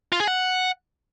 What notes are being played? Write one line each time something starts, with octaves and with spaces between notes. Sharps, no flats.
F4
G#4
F#5